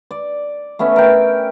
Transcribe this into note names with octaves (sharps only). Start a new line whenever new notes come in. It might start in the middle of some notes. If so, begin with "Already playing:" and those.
D5
A3 B3 C#4 E5
A#4 G5